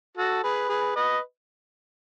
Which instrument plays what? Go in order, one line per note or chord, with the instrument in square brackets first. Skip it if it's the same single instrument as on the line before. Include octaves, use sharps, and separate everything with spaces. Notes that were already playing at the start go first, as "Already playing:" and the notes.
[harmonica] F#4 A4
G#4 B4
G#4 B4
B4 D#5